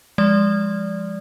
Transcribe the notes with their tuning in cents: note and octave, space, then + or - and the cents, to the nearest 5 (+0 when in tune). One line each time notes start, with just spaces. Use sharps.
F3 +0 G#3 -25 D5 -15